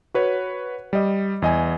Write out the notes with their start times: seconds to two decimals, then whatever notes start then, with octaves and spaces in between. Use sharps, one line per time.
0.14 F#4 B4 C#5
0.93 G3 D#5
1.42 E2 D#5 G#5